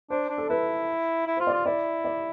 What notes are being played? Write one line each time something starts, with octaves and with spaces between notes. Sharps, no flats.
D4 C5
D4
A4
E4 B4
E4
F4 C5
D5
F4
E4 D5
D5